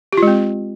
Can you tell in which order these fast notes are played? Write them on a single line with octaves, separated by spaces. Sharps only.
G4 F4 G#3 C4